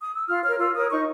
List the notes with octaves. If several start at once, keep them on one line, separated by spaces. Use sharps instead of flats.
D#6
E6
F4 F6
A#4 C#5 F6
F4 E6
A#4 C#5 D#6
D#4 C#6